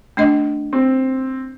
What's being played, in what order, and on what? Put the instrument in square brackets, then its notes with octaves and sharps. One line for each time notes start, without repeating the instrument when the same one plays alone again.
[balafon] A3 D4 D#5
[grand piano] C4